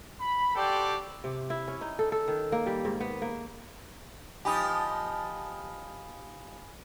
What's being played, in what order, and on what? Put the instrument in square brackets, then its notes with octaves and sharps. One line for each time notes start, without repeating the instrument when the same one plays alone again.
[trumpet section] B5
F#4 G4 A4 C5 D5 G5
[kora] C3
E4
C#4
D#4
A4
A4
D#3
A#3
G3
G#2
B3
A#3
[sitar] F3 D#4 G4 [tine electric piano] G#5 B5 D#6